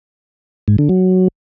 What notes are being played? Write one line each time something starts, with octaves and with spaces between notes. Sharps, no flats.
G#2
D3
F#3